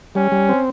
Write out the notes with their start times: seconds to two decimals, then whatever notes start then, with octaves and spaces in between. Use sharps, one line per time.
0.15 G3 C#4
0.32 G3
0.49 C4